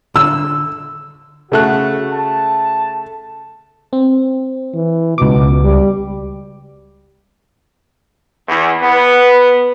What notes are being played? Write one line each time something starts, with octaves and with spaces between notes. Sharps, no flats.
D3 E6
C#3 A3 F#4 F#6
A5
C4
E3
C#2 B2 D6
G3
E2
B3